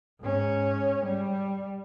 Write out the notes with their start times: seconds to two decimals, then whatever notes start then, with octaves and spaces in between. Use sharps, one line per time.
0.21 G#2 C#4
1.06 G3